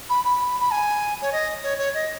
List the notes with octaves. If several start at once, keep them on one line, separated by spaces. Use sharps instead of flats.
B5
B5
B5
G#5
C#5
D#5
C#5
C#5
D#5